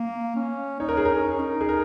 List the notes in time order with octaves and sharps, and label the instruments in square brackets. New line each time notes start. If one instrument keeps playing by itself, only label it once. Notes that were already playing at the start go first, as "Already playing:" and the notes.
Already playing: [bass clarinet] A#3
C#4
[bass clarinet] D#4 [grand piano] C#5
[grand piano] A#4
G#4
[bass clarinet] C#4 [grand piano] A#4
[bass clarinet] D#4
[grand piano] G#4
A#4